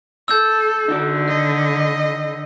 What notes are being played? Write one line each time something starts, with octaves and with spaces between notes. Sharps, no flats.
A4 E6 G6
D3 D#4 F#4 D5
D#3 D#5